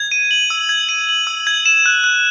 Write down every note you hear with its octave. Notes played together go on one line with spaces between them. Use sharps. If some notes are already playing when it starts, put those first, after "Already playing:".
Already playing: G#6
D#7
F#7
E6
G#6
D#7
F#7
E6
G#6
E7
F#6
F#6